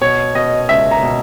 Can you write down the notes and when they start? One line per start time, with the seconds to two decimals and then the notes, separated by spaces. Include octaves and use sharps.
0.01 B2 C#5
0.35 B2 D#5
0.69 C#2 E5
0.91 A#5
1.03 B2